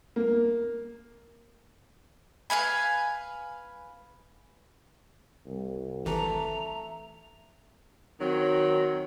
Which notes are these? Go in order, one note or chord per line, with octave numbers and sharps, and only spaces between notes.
A#3
B4 F5 G#5 B5
C2
G#1 E3 A3 A#5
D#3 F#3 C4